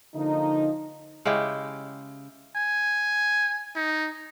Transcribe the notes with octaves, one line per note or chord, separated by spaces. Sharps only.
D3 F3 A#3 D#4
C#3 G#3 E4 G4
G#5
D#4